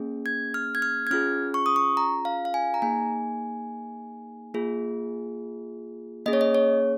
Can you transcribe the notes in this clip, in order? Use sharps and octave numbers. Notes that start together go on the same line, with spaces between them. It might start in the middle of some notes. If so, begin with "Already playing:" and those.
Already playing: A#3 C#4 G#4
G#6
F6
G#6
F6
G#6
C#4 F4 G#4 F6
C#6
D#6
C#6
A#5
F5
F5
G#5
A#5
A#3 D#4 G#4 G#5
A#3 F4 G#4
A#3 C#4 G#4 D#5
C#5
D#5
C#5